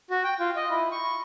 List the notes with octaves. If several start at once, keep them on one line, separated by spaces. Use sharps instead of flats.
F#4
G5
F4
D#5
E4
C#6